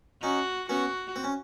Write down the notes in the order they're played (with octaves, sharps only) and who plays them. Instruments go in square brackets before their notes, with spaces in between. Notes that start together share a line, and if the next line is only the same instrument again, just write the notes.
[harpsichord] C#4 D#4 [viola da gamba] F#4
[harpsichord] B3 C#4 [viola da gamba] F#4
[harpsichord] C4
C#4